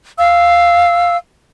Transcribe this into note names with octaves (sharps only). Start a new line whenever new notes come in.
F5 E6